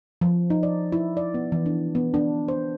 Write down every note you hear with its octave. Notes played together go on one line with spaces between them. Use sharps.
F3
D#4
D5
E4
D5
B3
E3
D4
B3
D4
C5